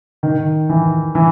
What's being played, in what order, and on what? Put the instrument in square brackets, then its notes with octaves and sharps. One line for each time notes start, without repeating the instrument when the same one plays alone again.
[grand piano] D#3
E3
E3